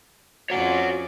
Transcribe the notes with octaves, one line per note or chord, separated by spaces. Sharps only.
F2 C#4 F#4 C#5 D5 F#5